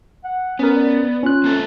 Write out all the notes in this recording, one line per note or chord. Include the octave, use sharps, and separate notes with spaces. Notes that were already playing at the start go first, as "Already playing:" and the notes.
F#5
B3 C#4 A#4
D5
C#4 F4 F#6
A#3 C4 A4